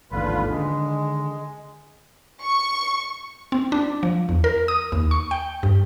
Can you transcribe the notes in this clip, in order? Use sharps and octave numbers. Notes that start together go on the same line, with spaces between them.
A1 D#2 G#2 D3 F4 B4
D3 D#3 G#3 D4
C#6
C4
D4
F3
E2
A#4
D#6
D#2
C#6
G5
G2